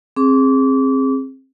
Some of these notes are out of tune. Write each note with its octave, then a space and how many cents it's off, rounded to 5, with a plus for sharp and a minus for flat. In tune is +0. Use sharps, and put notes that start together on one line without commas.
C4 +25 G#4 +0 D6 -35